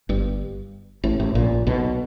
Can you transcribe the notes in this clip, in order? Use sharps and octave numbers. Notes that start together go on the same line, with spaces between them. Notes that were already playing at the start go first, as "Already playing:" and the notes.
G1 G2
A1 A2
A1 A2
A#1 A#2
B1 B2